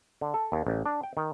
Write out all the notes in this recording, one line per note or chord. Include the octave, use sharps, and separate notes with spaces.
D3
A4
D#2
A1
D4
G5
D#3